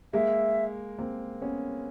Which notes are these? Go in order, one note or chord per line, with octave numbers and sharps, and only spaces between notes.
G#3 A#3 E5
A#3 C4
B3 C#4